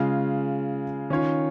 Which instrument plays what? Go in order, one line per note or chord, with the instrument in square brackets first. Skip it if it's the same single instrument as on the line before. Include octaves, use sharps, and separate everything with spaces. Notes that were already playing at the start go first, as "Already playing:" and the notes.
Already playing: [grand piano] C#3 G#3 F4
D#3 C#4 F4 C#5